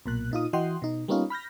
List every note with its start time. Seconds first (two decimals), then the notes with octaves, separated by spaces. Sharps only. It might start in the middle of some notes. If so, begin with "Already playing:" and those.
0.06 B1 A#2 F#6
0.31 A#2 D#4 F4 D#6
0.53 E3 F#4 D#5 F#5 G5 C6
0.82 B2 D#4
1.08 G3 A#3 B3 C#4 D#4 F4
1.30 B5 F6 G6 A#6